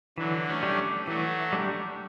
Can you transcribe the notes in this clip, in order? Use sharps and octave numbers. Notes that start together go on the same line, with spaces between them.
D3 E3 F#3
A3 C#4
G3 D4 G4
E3 F#3 A3
G3 D4 G4